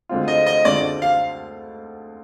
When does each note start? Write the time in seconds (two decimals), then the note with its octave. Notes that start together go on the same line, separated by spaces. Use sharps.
0.09 D2 D3 G#3 C4 F4
0.28 D#5
0.46 D#5
0.65 D2 D3 G#3 C4 F4 D5
1.02 F5